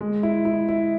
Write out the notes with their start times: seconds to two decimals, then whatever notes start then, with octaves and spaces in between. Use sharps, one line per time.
0.01 G#3
0.23 E4
0.45 E4
0.68 E4